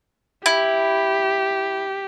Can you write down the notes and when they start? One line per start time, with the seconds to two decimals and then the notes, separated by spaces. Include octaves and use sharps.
0.46 E4 G4